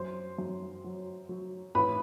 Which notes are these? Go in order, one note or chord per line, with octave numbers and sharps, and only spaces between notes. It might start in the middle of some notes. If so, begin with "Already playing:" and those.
Already playing: F#2 C5 C6
F#2
F#3
F#3
A1 B4 B5